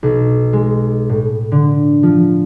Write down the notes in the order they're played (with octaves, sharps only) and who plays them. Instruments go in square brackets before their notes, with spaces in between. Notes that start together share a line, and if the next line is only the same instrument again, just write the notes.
[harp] B1
G#3
A2
D3
F3